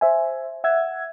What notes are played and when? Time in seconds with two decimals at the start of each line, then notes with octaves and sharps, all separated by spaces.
0.01 C5 E5 G#5
0.64 E5 F#5 E6 G#6